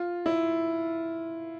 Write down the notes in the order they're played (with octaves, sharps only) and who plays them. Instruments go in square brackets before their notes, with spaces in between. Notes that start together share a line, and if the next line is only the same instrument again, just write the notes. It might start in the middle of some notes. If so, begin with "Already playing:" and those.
Already playing: [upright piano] F4
E4